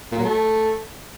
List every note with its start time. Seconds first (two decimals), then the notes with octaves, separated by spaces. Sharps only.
0.12 A#2
0.19 F#3
0.25 A3